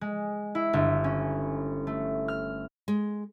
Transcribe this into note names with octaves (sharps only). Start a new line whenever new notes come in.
G#3
E4
G1
C#4
A3
F6
G#3